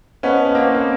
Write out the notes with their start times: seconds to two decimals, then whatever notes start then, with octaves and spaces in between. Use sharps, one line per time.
0.23 B3 C#4 C5 D#5 F#5 A5
0.45 B3
0.55 A#3 C4
0.75 A#3